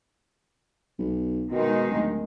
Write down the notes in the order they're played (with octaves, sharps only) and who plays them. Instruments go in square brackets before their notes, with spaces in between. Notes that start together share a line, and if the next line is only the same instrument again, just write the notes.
[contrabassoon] B1
[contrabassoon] B2 [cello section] D#3 G#3 D#4
[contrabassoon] D1